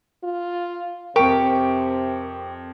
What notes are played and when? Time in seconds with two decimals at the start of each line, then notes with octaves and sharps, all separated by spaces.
0.24 F4
1.16 F2 C3 G4 A#4 C#6